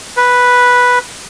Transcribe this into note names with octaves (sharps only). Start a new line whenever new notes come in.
B4